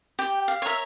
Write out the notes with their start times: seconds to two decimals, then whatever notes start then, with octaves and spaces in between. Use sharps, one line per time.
0.19 G4 G5
0.48 F5
0.62 A#4 C#5 E5